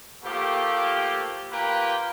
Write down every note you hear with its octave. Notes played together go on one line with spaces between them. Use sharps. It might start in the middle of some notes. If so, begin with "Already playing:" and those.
F3 A3 A#3 G4
A#3 F4 G4 A#4 B4 G5